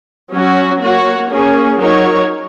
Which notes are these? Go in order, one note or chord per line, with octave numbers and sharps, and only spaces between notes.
F#3 C#4 F#4
A#3 F#4 C#5
A#3 C#4 G#4 C#5
F#3 D#4 F#4 A#4 C#5